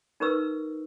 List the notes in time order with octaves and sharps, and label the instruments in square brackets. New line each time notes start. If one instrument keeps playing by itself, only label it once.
[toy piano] D#4 A#4 B4 C#6 E6